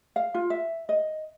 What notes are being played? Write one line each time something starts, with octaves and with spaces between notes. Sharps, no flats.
F5
F4
E5
D#5